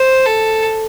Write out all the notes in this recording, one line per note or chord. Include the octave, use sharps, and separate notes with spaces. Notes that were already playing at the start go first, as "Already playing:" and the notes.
Already playing: C5
A4